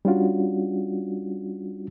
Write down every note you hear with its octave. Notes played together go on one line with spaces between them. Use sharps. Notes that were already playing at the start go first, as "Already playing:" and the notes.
G3 C#4 D4 F4 F#4